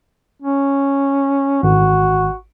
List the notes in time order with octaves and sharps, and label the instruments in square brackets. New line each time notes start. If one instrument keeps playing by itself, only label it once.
[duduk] C#4
[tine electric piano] G#1 [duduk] F#4